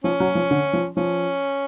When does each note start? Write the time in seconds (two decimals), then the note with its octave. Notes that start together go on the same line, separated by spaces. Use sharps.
0.04 F3 C#4
0.20 F#3
0.35 F3
0.51 D3
0.73 F3
0.97 F3 C#4